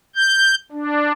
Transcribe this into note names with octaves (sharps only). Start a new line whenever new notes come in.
G6
D4